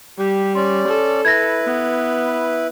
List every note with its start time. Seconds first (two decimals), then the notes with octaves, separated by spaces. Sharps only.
0.18 G3 G4
0.55 C#4 D5 C6
0.88 A4
1.25 E4 B4 G#6 A#6
1.63 B3